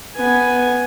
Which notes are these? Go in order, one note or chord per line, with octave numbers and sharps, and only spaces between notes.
B3 G#5